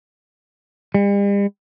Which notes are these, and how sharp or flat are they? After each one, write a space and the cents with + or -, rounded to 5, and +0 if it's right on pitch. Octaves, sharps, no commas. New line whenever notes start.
G3 +45